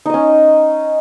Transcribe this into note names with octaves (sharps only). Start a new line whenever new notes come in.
C#4 D#4 D#5